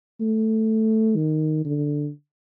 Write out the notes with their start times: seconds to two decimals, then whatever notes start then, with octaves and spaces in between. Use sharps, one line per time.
0.21 A3
1.16 D#3
1.65 D3